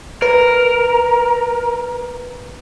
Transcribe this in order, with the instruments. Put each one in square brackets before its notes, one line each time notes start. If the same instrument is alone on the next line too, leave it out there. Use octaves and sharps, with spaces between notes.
[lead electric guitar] A#4 [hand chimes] B4